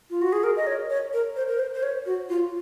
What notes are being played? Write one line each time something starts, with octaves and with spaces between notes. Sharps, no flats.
F4
F#4
G#4
A#4
D#5
C#5
C#5
A#4
C5
A#4
C5
C5
C#5
F#4
F4